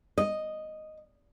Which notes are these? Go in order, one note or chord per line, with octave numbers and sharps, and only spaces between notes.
D#5